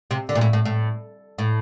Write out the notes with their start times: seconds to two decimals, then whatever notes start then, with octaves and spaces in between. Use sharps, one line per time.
0.11 C3
0.29 D3
0.35 A#2
0.41 A2
0.53 A2
0.65 A2
1.38 A2